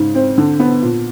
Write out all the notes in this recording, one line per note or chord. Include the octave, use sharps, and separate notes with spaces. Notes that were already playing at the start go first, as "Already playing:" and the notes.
Already playing: G#2 C#3
C4
D3
B3
A#2